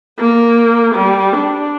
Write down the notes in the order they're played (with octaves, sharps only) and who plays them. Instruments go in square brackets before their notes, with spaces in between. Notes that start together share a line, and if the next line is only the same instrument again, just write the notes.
[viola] A#3
G3
D4